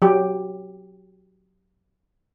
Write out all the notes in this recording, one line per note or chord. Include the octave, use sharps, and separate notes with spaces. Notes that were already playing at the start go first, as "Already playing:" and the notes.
F#3 G4